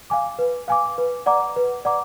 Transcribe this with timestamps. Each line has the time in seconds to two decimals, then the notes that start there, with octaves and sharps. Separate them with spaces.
0.10 F5 G#5 D6
0.39 B4
0.68 F5 G#5 D6
0.98 B4
1.26 D5 F#5 A#5 D6
1.56 B4
1.85 D5 F#5 A#5 D6